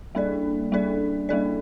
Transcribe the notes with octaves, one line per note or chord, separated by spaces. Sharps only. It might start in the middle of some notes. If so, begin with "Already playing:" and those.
G3 A#3 D4 A4 D5
G3 A#3 D4 A4 D5
G3 A#3 D4 A4 D5